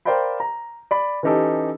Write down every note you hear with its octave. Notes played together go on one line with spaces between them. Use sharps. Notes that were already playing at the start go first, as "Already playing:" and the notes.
A#4 C5 D5 F5 G5 B5
A#5
D5 B5
E3 C#4 D#4 G4 A4